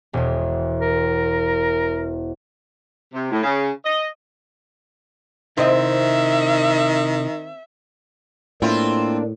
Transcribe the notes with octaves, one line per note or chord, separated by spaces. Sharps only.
E1 E2
A#4
C3
A2
C#3
D#5
C3 D#3 C4 E4 D#5 E5
A2 A#3 C4 D4 E4 F4